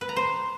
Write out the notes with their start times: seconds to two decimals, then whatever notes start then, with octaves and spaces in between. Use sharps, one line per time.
0.01 B4
0.09 A#5
0.16 C5